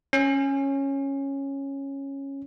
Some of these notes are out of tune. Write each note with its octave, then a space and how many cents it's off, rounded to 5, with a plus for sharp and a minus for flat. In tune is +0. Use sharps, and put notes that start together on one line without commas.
C#4 -10